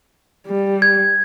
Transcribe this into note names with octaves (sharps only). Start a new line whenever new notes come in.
G3
G#6